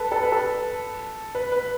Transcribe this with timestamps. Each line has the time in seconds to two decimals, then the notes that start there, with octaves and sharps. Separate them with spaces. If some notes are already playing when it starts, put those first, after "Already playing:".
Already playing: A4 B4
0.12 A4
0.23 B4
0.32 A4
1.35 B4
1.52 B4